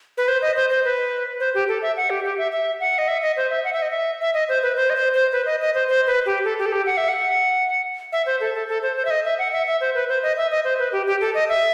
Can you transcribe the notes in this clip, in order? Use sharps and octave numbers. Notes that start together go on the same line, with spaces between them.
B4
C5
D#5
C5
C5
B4
C5
G4
A4
E5
F#5
G4
G4
E5
E5
F#5
D#5
E5
D#5
C5
E5
F#5
E5
D#5
E5
E5
D#5
C5
B4
C5
D#5
C5
C5
B4
D#5
D#5
C5
C5
B4
G4
A4
G4
A4
G4
F#5
E5
F#5
E5
C5
A4
A4
A4
C5
C5
E5
D#5
E5
F#5
E5
E5
C5
B4
C5
D#5
E5
D#5
C5
B4
G4
G4
A4
D#5
E5